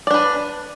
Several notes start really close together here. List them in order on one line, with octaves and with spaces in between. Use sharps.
D5 D4 B4